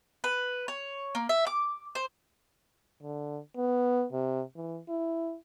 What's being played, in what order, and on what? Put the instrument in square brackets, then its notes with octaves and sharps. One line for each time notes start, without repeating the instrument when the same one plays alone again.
[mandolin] B4
C#5
A#3
E5
D6
C5
[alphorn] D3
B3
C3
E3
E4